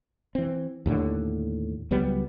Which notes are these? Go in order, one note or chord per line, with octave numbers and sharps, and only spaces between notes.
E3 C4
D#2 A2 D3
C#2 F#3 G3 B3